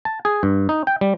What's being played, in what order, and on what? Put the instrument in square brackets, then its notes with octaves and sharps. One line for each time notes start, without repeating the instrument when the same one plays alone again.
[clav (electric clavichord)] A5
G#4
G2
D#4
G5
G3